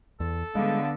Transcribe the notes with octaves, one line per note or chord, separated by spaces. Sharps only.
E2 A4
D3 G3 G#3 B3 F5